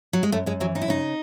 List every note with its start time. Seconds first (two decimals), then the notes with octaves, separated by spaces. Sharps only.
0.13 F#3
0.23 G#3
0.32 F#2 A3
0.46 F#2 G#3
0.60 E3 F#3
0.75 F#2 D#4
0.81 E4
0.88 C#3 D#4